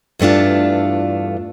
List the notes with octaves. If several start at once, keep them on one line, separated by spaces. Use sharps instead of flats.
E2 G2 A3 D4 F4